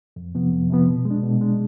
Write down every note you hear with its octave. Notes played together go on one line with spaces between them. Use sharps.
F2
C3 F3 B3
F2
C3 F3 B3
B2
G#3
D4
B2
G#3 D4